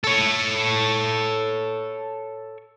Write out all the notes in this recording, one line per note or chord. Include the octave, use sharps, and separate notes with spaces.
A4 C#5